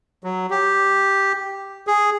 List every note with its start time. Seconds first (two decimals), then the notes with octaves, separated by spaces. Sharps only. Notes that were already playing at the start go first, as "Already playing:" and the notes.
0.24 F#3
0.50 G4
1.87 G#4